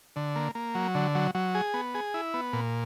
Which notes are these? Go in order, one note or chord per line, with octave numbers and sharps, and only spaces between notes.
D3
A#3
A#3
F#3
D3
F#3
F#3
G#4
B3
G#4
E4
B3
A#2